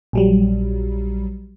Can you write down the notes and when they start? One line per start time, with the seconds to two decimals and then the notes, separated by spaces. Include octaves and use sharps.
0.13 A#1 F#3 G3